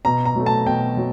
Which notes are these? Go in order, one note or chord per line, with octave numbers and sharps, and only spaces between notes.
B2 A#5
A#5
F#3 A3
A5
B2 G5
F#3